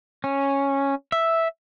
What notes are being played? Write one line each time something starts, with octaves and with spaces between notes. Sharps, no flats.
C#4
E5